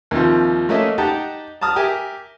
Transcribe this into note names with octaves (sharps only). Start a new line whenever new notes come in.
D#2 C3 F3
A3 A#3 C#4 D#5 E5
D#4 G4 F#5 G5 A5 A#5
A5 A#5 D#6 F6
G4 A#4 E5 G#5